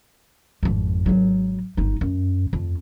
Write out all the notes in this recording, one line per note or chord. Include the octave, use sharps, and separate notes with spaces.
G#1 F2
G#1 F#3
G1 D#4
F#2
F2